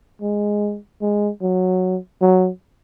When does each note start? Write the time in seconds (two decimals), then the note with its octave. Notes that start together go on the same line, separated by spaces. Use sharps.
0.22 G#3
1.01 G#3
1.41 F#3
2.21 F#3